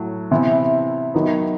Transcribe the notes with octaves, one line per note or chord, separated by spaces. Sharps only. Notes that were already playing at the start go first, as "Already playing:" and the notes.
Already playing: A2 F#3
C3 E3 B3 E4
D#3 F#3 B3 D#4